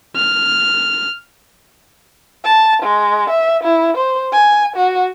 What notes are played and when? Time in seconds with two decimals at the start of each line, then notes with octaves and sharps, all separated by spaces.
0.16 F6
2.45 A5
2.83 G#3
3.31 E5
3.64 E4
3.97 C5
4.33 G#5
4.77 F#4